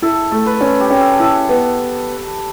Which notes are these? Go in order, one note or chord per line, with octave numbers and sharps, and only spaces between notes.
E4 A4
A3 A4
B4
C#4
G4
C#4
A4
E4 A4
B3